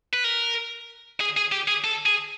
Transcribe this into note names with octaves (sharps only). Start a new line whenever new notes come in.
B4
A#4
G#4
G#4
G4
G#4
A4
G#4